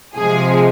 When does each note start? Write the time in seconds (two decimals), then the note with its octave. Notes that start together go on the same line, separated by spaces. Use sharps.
0.15 C3 F3 G#3 G#4